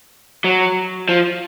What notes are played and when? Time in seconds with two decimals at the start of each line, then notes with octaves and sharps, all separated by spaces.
0.44 F#3
1.09 F3